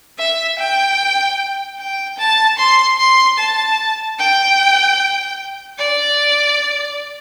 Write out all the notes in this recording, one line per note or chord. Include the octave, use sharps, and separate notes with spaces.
E5
G5
G5
A5
C6
C6
A5
G5
D5